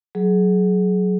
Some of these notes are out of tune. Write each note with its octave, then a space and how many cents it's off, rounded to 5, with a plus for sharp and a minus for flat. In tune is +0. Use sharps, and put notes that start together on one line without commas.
F#3 +0 G#4 +25